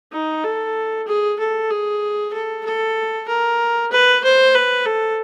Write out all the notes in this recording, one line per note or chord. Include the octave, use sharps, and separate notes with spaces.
D#4
A4
G#4
A4
G#4
A4
A4
A#4
B4
C5
B4
A4